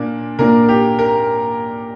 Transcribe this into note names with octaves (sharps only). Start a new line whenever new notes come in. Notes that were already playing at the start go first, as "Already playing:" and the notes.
Already playing: A#2 A#3 D4
A#2 A#3 D4 A#4
G4
A#4